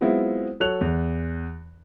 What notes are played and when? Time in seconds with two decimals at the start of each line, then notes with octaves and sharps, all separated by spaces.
0.01 F#3 G#3 B3 C4 E4 F4
0.60 F#3 A4 C#5 F#6 F7
0.81 E2